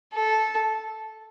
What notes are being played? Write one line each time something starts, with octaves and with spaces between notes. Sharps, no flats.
A4